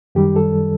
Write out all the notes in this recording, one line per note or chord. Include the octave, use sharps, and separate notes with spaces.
F#2 D#3 G3 G4
A4